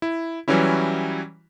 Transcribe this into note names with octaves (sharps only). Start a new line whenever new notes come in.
E4
E3 F#3 G3 C#4 E4